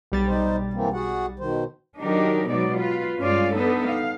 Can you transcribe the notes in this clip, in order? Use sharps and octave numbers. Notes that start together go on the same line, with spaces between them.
B1 G3 A6
D#4 C5
E3 A#3 C4
F#4 G#4 F#5
B2 D#3 C5
D#3 F#3 D4 D#4 G4 A#4
B2 F#3 G#3 B3 D#4 D5
F4 B4
G2 G#3 C#4 F4 D5 F5
B3 D4 D#4 A4 B4
F5